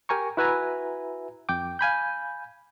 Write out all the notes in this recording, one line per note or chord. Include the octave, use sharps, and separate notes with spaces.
G4 A#4 G#5 A#5 C#6
E4 F#4 B4 E5 G#5 A#5
F2 G5 D6
F5 G#5 B5 G6